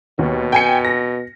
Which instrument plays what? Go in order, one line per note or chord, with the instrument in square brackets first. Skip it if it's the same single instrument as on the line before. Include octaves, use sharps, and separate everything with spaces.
[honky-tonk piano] D#2 [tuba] B2
[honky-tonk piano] G5 G#5 C#7
A#6